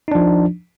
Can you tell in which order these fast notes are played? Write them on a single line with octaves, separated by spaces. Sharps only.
D#4 D4 F3